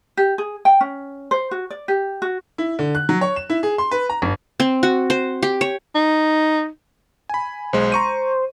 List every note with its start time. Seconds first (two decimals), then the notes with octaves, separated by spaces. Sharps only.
0.17 G4
0.38 G#4
0.65 G5
0.81 C#4
1.31 C5
1.51 F#4
1.70 D5
1.88 G4
2.22 F#4
2.58 E4
2.79 D3
2.95 F#6
3.09 F#3
3.21 C#5
3.36 E7
3.50 E4
3.63 G#4
3.78 C6
3.91 B4
4.10 A#5
4.22 G1
4.60 C4
4.83 F#4
5.10 C5
5.43 G4
5.61 C#5
5.95 D#4
7.29 G#5 B5
7.73 B1 G#3 C5
7.92 A#5 C#6 D#7